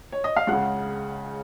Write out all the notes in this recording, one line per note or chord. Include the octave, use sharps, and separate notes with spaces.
C#5
D#5
F5
C#2 C#3 F#5